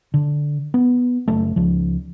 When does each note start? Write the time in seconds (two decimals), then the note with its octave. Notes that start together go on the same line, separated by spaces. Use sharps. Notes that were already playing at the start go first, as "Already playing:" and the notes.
0.14 D3
0.74 B3
1.28 F#1 A3
1.56 C#2 F3